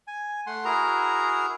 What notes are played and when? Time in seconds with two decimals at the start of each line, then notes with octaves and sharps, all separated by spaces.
0.07 G#5
0.47 A3 F#5 C6
0.65 E4 F#4 G#4 A#4 A#5